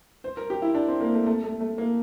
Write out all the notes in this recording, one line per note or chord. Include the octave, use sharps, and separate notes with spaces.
C5
A#4
G4
E4
D4
C4
A#3
A3
A3
A3
A3
A#3